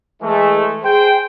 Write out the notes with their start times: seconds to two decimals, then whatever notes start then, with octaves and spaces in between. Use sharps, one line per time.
0.22 E3 G#3 A3
0.83 G#4 C5 G5